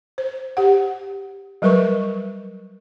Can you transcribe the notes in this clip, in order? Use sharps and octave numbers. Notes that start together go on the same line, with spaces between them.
C5
G4 F#5
F#3 G3 A#4 B4 C#6